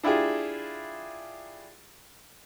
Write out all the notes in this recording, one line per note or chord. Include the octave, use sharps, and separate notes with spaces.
D4 E4 F4 G4 G#4